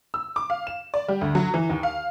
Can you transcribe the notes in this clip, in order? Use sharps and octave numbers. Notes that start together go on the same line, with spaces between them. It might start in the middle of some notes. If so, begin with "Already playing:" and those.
E6
D6
F5
E7
D5
G3
D2
F#3
E3
D#2
F5